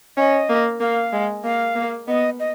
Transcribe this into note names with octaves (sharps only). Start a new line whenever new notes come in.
C#4 D#5
A#3
A#3 F5
G#3
A#3 F5
A#3
B3 D#5
D#5